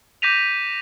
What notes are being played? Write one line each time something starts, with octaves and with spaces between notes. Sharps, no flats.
D6 G6 A#6 B6 D#7 F7